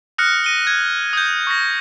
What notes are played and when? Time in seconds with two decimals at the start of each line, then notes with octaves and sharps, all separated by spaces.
0.18 D#6 F6 F#6 A#6 C#7
0.44 A#6 D#7 G7
0.67 G#6
1.13 D#6 G6
1.47 C#6 A#6